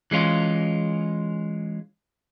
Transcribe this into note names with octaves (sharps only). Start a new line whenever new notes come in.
E3 G#3 C#4 F4